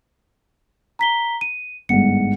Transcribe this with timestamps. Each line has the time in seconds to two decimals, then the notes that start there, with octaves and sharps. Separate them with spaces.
0.99 A#5 B6 G7
1.41 D#7
1.89 G1 G#2 F#5 C#7